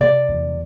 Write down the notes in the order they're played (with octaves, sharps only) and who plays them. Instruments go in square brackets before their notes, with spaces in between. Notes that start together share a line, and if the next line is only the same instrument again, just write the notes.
[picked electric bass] C3 [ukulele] D5
[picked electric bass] E2